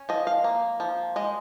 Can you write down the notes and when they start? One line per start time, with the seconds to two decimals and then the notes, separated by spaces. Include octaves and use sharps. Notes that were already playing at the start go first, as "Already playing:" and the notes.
Already playing: C#4
0.09 F3 D#5
0.27 F5
0.44 A#3
0.80 F3
1.16 G#3 D#5